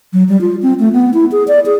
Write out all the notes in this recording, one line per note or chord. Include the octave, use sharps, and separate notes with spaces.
F#3
G3
F4
C4
A3
B3
E4
G#4
D5
G#4